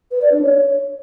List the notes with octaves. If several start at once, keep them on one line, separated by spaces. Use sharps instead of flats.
B4
D5
D4
C#5